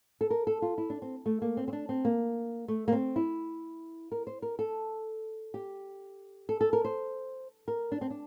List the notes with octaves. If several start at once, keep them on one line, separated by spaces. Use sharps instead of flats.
A4
A#4
A4
F4
E4
D4
C4
A3
A#3
C4
C4
D4
C4
A#3
A3
A#3
C4
E4
A#4
C5
A#4
A4
G4
A4
A4
A#4
C5
A#4
D4
C4
D4